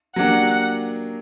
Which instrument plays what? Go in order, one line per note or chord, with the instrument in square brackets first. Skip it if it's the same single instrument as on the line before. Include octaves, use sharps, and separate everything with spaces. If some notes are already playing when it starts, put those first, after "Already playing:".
[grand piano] F#3 A#3 D4 G4 [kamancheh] F#5